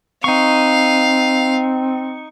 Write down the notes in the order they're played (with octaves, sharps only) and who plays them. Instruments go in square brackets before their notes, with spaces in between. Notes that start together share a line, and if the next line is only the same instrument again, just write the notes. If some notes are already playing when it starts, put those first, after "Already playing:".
[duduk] C4 [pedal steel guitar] D#4 C#6 [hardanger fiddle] F5